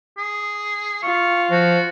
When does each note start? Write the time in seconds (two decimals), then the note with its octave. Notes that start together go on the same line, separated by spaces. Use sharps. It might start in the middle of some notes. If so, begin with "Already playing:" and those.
0.18 G#4
1.03 F4 C#6
1.51 F3 F#4